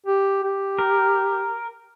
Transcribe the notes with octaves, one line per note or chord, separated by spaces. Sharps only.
G4
G4
A#4